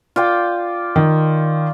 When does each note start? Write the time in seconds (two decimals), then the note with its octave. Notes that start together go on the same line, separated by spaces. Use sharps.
0.16 F4 D5 G5
0.96 D#3